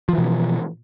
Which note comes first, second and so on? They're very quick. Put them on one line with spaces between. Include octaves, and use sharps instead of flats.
F3 E3 B2